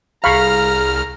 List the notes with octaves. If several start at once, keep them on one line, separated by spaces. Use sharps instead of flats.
C2 G#4 F5 A#5 B5 C#6 F6